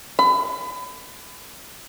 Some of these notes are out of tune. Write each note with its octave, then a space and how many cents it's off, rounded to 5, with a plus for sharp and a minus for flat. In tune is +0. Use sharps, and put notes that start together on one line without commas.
B5 +30